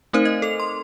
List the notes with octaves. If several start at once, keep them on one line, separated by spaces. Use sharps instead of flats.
A3 C4 D#4 A#4 C5
D#5
A4 F7
C6